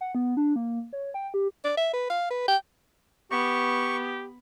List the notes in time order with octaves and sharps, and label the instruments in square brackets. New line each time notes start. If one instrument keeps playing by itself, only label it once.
[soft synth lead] F#5
B3
D4
A#3
C#5
G5
G4
[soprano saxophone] D5
E5
B4
F5
B4
G5
[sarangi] B3 [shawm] G4 [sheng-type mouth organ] C#6